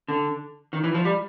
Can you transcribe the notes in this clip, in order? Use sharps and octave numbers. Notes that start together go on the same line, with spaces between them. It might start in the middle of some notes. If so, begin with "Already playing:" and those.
D3
D#3
E3
F3
G3